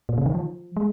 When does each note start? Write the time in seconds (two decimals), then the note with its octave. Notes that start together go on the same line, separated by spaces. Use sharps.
0.09 A#2
0.18 C#3
0.26 D#3
0.35 F3
0.77 G#3